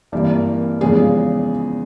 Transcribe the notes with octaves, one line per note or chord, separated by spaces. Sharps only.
G#1 G2 E3 A#3
E2 C#3 F3 G#3 G#4